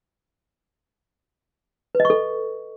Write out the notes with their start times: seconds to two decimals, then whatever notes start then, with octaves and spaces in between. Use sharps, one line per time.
1.95 B4
2.00 D#5
2.05 C#6
2.10 A4